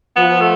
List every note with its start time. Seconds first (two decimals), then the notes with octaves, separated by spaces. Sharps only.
0.16 F3 B3
0.41 A3